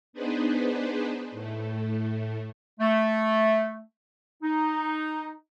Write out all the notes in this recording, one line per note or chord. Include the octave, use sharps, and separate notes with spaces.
B3 D4 D#4 G#4 B4 C5
A2 A3
A3
D#4